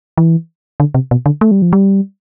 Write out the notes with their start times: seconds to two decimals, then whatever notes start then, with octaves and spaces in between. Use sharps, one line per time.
0.18 E3
0.80 D3
0.94 C3
1.11 B2
1.26 D3
1.41 A3
1.51 G3
1.62 F3
1.73 G3